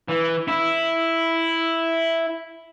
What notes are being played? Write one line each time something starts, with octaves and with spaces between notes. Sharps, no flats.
E3
E4